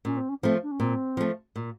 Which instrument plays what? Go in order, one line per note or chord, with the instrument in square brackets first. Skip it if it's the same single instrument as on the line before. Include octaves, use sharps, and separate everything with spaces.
[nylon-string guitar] A#2 [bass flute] C#4
[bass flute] C4
C#4
[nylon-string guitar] F3 A3 [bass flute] C4
[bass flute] D4
C#4
[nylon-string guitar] A#2 [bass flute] C4
[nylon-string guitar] F3 A3
A#2